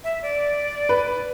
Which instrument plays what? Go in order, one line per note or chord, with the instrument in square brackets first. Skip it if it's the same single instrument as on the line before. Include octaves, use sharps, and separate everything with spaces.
[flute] E5
D5
[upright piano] B4